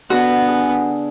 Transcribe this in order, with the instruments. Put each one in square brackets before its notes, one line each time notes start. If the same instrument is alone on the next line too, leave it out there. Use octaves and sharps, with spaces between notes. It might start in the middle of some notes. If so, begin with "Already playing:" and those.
[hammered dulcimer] D3 [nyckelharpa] B3 [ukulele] F#4
[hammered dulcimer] G#4